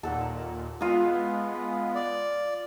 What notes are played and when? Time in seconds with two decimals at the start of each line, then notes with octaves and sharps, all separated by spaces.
0.03 D#2 A#2 A4 F#5
0.81 G#3 B3 F4 D#6
1.95 D5